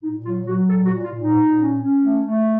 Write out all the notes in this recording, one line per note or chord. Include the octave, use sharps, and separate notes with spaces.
A#2 D#4
F#3 F4
F#3 F#4
A#2 A4
F#4
A#2
F4
A#2
D#4
A#2
C#4
C#4
A3
A3